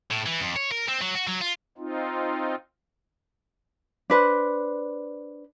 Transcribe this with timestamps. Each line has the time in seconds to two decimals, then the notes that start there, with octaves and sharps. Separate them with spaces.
0.11 A2
0.26 E3
0.41 F2
0.56 C#5
0.72 A#4
0.89 C4
1.02 F#3
1.15 F#4
1.27 F#3
1.41 F4
1.78 C4 D#4 F4
4.10 D4 B4 C5